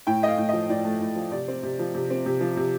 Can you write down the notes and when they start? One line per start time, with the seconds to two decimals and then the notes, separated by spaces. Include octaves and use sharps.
0.07 A2 G5
0.22 A3 D#5
0.28 F5
0.38 A2
0.49 F3 D#5
0.69 A2 D5
0.84 A3
1.01 A2
1.16 F3
1.31 C3 D5
1.48 C4
1.63 C3
1.79 F3
1.94 C3
2.10 C4
2.26 C3
2.41 F3
2.57 C3